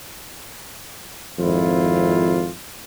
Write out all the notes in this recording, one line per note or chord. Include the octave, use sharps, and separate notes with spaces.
G#1 F2 E4 F4